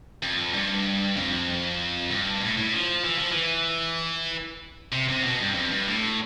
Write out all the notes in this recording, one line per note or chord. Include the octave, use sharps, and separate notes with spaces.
F2
G2
F2
G2
A2
A2
F3
E3
F3
E3
C3
C3
B2
G2
F2
G2
A2